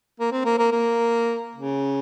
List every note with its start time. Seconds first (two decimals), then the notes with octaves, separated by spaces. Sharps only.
0.20 A#3
0.32 C4
0.45 A#3
0.59 A#3
0.72 A#3
1.56 C#3